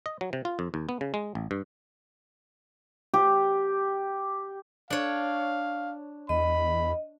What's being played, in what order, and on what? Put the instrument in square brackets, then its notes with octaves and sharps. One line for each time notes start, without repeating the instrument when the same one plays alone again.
[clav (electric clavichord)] D#5
F#3
C3
F4
F2
D#2
B3
C#3
G#3
A1
G2
[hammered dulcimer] G4
[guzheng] D4 C#5 [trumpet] F5
[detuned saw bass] E2 [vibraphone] D#5 [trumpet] B5